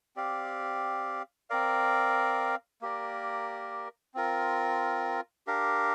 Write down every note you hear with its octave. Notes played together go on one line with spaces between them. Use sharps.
C4 G4 D5 F5
C4 A#4 D5 F5
A#3 G4 A#4 D5
C4 F4 A#4
D4 G4 A#4 F5